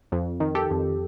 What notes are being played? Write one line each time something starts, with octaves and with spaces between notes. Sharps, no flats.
F2
D#3
G4 A4
F2